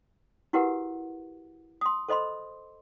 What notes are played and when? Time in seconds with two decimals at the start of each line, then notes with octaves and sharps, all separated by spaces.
0.53 E4 F#4 G4 A#4 B4 F#5
1.81 C6 D#6
2.09 A4 C5 D#5 B5 C6